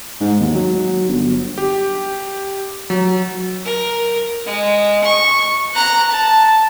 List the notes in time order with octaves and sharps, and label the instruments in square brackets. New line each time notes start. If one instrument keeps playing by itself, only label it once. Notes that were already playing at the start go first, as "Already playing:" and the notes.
[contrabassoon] G#2
D#2
F#3
G1
[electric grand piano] G4
F#3
[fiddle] A#4
G#3
C#6
A#5 F#6
A5